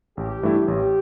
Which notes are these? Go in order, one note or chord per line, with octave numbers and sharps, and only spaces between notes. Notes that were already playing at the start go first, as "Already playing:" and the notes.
A1 G4
G2 E3 A3 E4
A1 G4